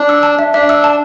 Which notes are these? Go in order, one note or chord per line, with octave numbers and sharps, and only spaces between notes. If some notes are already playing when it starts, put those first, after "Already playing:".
Already playing: D4
E6
A5
E5
D4 E5
E6
A5